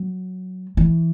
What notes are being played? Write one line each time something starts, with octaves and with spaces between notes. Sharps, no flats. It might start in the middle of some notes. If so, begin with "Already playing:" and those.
Already playing: F#3
E3